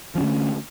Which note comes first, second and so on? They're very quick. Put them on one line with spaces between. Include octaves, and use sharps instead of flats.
F3 C#4 D3 A3